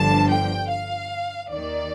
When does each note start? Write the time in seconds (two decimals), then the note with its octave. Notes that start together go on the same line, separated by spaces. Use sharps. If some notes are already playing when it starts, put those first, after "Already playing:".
Already playing: G1 G2 D3 F3 A5
0.30 G5
0.71 F5
1.52 D#2 D#3 D5